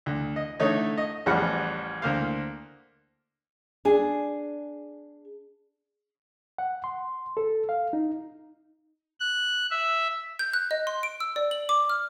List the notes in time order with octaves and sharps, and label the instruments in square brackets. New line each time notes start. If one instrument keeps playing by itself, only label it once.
[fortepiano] D2
D#5
D3 A3 D#4 C#5
D#5
A1 E2 F3 G3 F#5
D2 A#3 C5 F5
[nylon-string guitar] D4 G#4
[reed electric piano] F#5
C6
A4
F5
D#4
[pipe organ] F#6
E5
[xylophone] G6
F#6
D#5
C6
D7
E6
D5
F#7
D6
F6